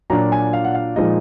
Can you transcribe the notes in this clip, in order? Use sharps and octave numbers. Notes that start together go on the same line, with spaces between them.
A#2 F#3 D4 F4 A#5
G#5
F5
F#5
F5
A#2 F3 G#3 D#4 D#5